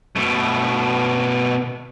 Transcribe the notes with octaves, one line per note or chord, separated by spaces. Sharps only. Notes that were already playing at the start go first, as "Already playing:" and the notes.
B2 A3